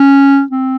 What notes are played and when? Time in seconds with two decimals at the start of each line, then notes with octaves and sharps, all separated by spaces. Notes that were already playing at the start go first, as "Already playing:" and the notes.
Already playing: C#4
0.51 C4